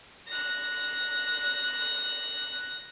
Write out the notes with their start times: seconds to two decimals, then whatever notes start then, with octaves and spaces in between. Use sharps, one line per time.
0.28 F#6 A#6